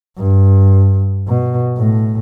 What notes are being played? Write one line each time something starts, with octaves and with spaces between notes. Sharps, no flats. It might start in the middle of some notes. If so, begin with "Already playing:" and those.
G2
B2
A2